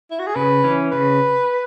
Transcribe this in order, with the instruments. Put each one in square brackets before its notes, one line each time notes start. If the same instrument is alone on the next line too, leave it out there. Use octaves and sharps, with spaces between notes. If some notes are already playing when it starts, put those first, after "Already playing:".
[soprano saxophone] E4
F#4
G#4
[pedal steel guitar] C#3 [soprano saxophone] B4
[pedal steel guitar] E3 C#4
[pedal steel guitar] C#3 [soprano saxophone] B4